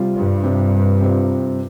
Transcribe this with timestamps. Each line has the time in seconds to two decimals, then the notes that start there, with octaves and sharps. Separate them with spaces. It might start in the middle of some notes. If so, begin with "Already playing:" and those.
Already playing: C3 G3 C4 F4
0.14 G2
0.43 C3 G3 C4 F4
1.01 C3 G3 C4 F4